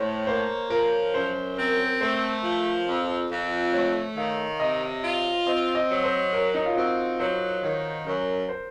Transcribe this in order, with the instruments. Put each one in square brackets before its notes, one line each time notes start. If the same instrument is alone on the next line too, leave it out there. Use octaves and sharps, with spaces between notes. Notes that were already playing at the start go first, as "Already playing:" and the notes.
Already playing: [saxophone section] A2 [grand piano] C5 C#5
[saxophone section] A#3 [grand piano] C5
[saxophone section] F3 [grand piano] A#4
[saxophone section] F#2 [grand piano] C5
[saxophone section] C4 [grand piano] A#4
[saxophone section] A3 [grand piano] C5
[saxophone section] F3
F2
F2
[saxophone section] A3 [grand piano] C#5
[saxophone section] D#3 [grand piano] F5
[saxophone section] C3 [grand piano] D#5
[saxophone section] F4
[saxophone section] C4 [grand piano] D#5
[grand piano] D#5
[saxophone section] F#3
[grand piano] C5
[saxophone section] F#2 [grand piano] A#4
[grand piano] D#4
F4
[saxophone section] C4 [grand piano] F#4
[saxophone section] F#3 [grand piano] C5
[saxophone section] D#3 [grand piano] C#5
[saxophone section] F#2 [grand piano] A#4
[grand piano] C5